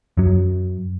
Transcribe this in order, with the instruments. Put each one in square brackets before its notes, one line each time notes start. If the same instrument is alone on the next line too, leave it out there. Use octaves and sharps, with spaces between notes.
[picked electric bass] F#2 F#3